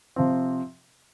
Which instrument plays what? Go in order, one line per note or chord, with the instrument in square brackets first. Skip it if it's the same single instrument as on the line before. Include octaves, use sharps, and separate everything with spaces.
[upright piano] C3 F3 C4